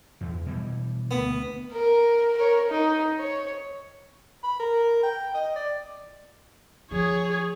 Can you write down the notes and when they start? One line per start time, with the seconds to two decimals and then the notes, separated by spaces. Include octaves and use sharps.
0.21 E2
0.46 B2 E3 G3
1.11 D2 B3
1.72 A#4
2.37 A#4 C#5
2.69 D#4
3.20 C#5
4.43 B5
4.60 A#4
5.03 G5
5.34 D#5
5.56 D5
6.91 F3 G#4 C#5